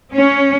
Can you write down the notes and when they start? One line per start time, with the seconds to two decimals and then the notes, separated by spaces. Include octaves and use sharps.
0.14 C#4